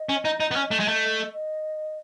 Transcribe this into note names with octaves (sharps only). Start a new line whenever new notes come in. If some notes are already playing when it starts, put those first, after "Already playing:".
Already playing: D#5
C#4
D#4
D#4
B3
C#4
A3
G#3
A3
D#5